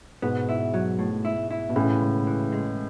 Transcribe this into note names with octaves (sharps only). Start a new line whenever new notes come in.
G#2 B2 B3
E4
F#3
A2
E4
E4
B2
A2 C#3 E3
C#2
E3
G#3